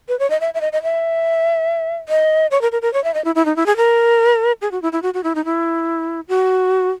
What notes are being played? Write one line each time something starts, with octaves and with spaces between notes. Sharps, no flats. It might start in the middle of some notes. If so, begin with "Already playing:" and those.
B4
C#5
D#5
E5
E5
D#5
D#5
E5
D#5
C#5
A#4
A#4
A#4
C#5
E5
D#5
E4
E4
D#4
E4
G#4
A#4
G#4
F#4
E4
E4
F#4
F#4
E4
D#4
E4
F#4